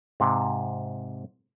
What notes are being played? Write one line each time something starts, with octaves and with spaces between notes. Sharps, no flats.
G#2 C3